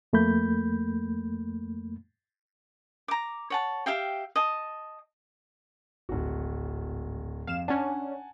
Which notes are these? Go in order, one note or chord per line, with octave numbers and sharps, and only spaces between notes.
F2 A3 A#3 B5 G6
A#5 D6
C#5 F#5 A5
G4 E5 F5 G5
D#5 A5
D1 G#1 F#4
F2 F5 E7
C#4 D4 F#5 G#5 A5